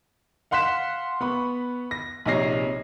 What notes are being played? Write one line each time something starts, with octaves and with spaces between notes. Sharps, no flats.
F5 F#5 C6 F#6 B6 E7
B3 B5 C#6
A#6
A#1 C3 D#4 C#5 A#6 C7